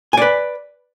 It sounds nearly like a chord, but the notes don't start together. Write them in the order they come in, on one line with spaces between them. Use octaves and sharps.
G#5 D5 B4